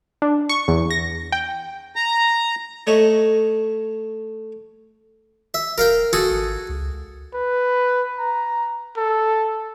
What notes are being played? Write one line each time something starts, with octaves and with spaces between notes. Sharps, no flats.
D4
C#6
E2
A#6
G5
A#5
A3 C#5 D#5 E5
E5
D1 A#4 F5 G5
D1 F#4 G#4 A4
G#1
C#2
B4
A#5
A4